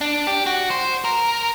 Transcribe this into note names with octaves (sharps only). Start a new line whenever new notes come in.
D4
G4
F#4
C5
A#4